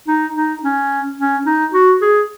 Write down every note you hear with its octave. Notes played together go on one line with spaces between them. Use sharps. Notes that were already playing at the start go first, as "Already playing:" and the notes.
D#4
D#4
C#4
C#4
D#4
F#4
G#4